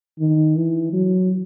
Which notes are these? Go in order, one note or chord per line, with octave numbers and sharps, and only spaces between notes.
D#3
E3
F#3